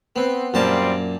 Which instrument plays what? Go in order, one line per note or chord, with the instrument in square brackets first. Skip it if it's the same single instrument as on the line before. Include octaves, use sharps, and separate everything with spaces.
[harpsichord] B3 [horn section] C4
[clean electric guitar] F#2 A#3 [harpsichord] A#2 A5 [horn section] G3 C4 F4